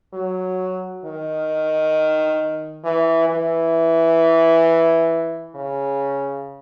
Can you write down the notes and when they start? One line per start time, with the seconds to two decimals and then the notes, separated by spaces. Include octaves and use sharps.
0.14 F#3
1.05 D#3
2.84 E3
3.29 E3
5.55 C#3